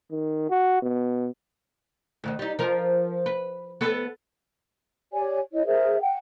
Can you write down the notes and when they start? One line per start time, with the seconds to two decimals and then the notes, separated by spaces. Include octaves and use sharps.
0.11 D#3
0.50 F#4
0.82 B2
2.24 D2 B2 D#3
2.39 G3 D#4
2.59 F3 A#4
3.26 B4
3.81 B3 A4 B4
5.13 G4 C#5 D5 G#5
5.53 E4 C#5 D#5
5.66 G#4 A#4 C5 E5
6.01 F#5 G5